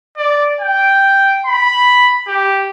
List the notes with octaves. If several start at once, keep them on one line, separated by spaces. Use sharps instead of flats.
D5
G5
B5
G4